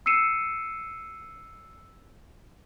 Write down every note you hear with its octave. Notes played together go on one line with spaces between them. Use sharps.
E6 C7 C#7 D#7 E7